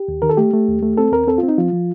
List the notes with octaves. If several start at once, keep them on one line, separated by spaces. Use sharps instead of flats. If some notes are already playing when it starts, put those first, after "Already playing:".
Already playing: G4
D#2
D#3 A#4
A4
A3 G4
A3
D#2
A3
C4 A4
D#2 A#4
C4 A4
F4
C4
D#4
F3 F4
F3